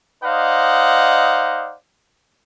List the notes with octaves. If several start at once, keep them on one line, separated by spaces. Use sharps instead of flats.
D#4 C5 D5 D#5 F5 F#5